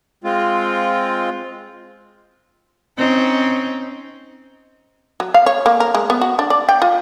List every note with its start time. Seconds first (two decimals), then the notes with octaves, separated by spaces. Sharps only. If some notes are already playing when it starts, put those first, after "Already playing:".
0.24 G#3 C4 F4
2.98 C4 C#4 D#4
5.20 F#3
5.34 F5
5.46 C#5
5.66 A#3
5.80 A#4
5.94 G#3
6.10 B3
6.21 F#4
6.39 D4
6.50 D5
6.69 G5
6.82 F4